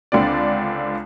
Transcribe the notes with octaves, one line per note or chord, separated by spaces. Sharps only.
C#2 D3 C4 D5